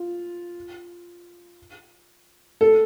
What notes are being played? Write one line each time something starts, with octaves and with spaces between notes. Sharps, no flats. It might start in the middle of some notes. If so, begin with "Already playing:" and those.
Already playing: F4
A4